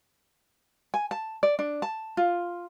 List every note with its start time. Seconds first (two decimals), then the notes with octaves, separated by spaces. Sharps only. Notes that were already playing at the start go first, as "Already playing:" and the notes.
0.94 G#5
1.11 A5
1.43 D5
1.59 D4
1.82 A5
2.17 F4